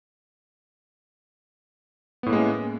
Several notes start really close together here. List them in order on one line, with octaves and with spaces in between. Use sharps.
B3 A2 A#3 G#3 C#4